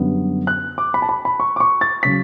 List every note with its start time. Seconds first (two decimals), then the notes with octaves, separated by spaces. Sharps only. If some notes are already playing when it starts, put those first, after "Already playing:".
Already playing: F#2 D3 G3 B3
0.47 F#6
0.78 D6
0.94 B5
1.02 A5
1.09 B5
1.25 B5
1.40 C#6
1.56 D6
1.60 C#6
1.81 A6
2.03 C#3 F#3 C#4 B6